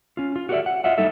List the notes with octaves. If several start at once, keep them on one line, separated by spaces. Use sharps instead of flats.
C#4 F4
F4
F#4 G4 A4 A#4 D5 E5
F#5
F4 D#5 E5 F#5
G3 A3 D#4 A4 E5